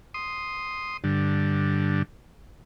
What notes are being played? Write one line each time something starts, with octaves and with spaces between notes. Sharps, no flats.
C6 D#6
G2 D3